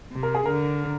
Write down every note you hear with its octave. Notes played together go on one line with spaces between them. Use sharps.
C3
A#4
G#4
D3 A#4